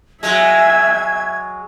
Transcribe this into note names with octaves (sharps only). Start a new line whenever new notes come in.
F#3 G#3 E5 G#5 G#6